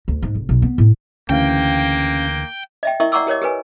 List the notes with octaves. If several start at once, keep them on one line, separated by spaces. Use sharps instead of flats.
D2
G#2
F1
B1
B3
A2
D2 C#3 E3 A#3 C#4 F5 G5
D#5 E5 G5
E4 A#4 D#5 E5 C#6
D5 F#5 A#5 C#6 D6 E6
G4 A#4 C#5 D#5
G4 A#4 B4 G#5